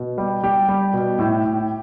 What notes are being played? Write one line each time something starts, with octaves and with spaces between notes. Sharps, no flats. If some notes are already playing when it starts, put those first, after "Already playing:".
Already playing: B2
G3
G3 G4
G3
B2
A2
A2